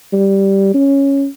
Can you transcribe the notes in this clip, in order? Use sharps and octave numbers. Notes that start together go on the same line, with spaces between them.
G3
C#4